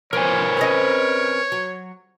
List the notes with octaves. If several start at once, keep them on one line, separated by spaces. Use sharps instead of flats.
F3 A#4 B4 C#5 G#5
C4 C#4 D#5
F#3